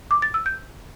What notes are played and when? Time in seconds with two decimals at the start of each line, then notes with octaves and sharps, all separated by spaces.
0.11 D6
0.22 A6
0.34 E6
0.46 G6